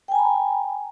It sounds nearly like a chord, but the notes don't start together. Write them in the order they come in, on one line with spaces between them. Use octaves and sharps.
G5 G#5 A#5 B5